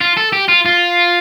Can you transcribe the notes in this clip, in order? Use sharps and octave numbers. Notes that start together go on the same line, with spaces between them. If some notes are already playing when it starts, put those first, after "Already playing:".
F4
A4
G4
F4
F4